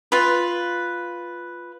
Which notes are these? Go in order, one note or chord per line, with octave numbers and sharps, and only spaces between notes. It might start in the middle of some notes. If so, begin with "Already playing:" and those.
F4 B4